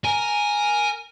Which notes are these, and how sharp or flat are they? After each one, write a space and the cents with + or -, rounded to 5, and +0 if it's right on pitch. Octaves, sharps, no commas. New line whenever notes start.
A#4 +0 G#5 +0